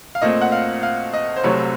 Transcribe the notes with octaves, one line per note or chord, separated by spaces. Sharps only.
F5
A#2 A3 C4 D#5
F#5
F5
F5
D#5
C5
C2 C3 F#3 A3 C4 C#5